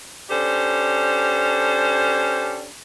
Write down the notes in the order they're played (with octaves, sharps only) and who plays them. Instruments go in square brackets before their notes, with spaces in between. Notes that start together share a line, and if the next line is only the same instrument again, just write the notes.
[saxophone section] C#4 D4 G4 A4 C5